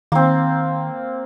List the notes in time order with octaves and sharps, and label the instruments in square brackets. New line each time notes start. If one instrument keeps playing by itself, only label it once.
[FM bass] D#3 [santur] A#3 C4